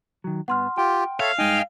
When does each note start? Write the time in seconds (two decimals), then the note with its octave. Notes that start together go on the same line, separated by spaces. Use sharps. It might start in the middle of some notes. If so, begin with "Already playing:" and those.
0.24 D#3 F#3
0.48 G2 B3 F#5 C6 F6
0.78 F4 G4 G5
1.20 A4 C#5 E5 F5
1.38 G2 G#3 D#4 D#5 G5 G#5